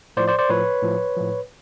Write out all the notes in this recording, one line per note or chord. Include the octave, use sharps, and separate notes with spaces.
A2 F3 C5 D5
C5 D5
C5 D5
A2 F3 B4 C#5
A2 F3
A2 F3